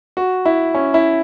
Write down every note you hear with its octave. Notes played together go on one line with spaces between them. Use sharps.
F#4
E4
C#4
E4